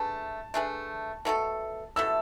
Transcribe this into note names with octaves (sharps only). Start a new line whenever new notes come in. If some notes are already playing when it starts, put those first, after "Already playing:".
Already playing: A3 D4 G#4 B4 A5
A3 D4 G#4 B4
B2 A3 E4 A4
B2 A3 E4 A4 E6